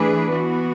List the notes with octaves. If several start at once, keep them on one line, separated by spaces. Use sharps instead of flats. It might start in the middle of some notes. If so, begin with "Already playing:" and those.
Already playing: E3 A3 D4 G#4 B4
E3 B3 F#4